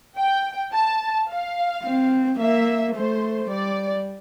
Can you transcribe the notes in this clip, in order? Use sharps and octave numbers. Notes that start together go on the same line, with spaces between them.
G5
A5
F5
C4
A#3 E5
A3 C5
G3 D5